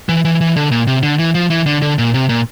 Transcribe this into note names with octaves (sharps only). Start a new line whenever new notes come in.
E3
E3
E3
D3
A#2
C3
D3
E3
F3
E3
D3
D3
A#2
C3
A#2